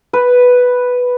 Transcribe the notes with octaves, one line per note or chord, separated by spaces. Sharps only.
B4